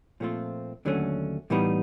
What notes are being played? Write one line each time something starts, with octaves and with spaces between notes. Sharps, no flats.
A#2 F3 A3 C4 F4
D#2 D3 F#3 A3 C#4
A2 E3 G3 B3 D#4